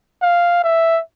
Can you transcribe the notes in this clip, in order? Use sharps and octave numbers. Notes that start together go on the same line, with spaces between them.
F5
E5